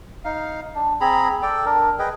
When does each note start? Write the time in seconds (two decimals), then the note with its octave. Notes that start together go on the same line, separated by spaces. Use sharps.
0.25 D#4 F5
0.75 D4
1.01 C4 G#4 A#5 B5
1.42 A4 D5 G5
1.65 D4 A#4
1.99 G#4 B4 D#5 G5